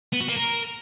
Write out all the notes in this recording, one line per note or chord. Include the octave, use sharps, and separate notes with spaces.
B3
F#4
A#3
A#4